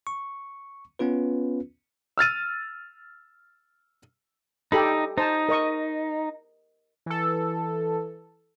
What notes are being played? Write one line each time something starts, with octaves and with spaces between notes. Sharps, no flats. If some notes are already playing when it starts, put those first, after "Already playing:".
C#6
B3 C#4 F4 B4
E6 F6 A6 D#7
D#4 G4 A4 B5
D#4 C5 A5
A#4 D#5 C#6
E3 A4